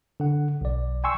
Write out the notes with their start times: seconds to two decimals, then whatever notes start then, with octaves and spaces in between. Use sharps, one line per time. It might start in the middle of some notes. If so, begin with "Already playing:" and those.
0.20 D3 F#5
0.61 B1 D5
1.04 G5 G#5 C6 C#6 E6